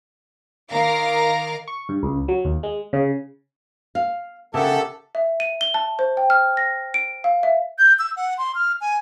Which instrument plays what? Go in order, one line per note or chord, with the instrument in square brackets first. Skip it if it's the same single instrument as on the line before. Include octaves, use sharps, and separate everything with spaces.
[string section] D#3 A#4 F5 D6 A#6
[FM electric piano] C#6
G2
C#2
F#3
D#2
G#3
C#3
[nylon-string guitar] F5
[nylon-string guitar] C#3 [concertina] G4 E5 A5 [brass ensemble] A4 [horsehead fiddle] A#4 F#5
[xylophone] E5
D#7
G7
A5
C5
G5
F6
A#6
D7
F5
E5
[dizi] G6
E6
F#5
C6
F6
G#5